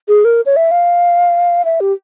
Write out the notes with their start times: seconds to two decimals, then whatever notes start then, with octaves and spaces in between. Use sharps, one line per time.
0.08 G#4
0.25 A#4
0.46 C#5
0.56 E5
0.71 F5
1.65 E5
1.80 G4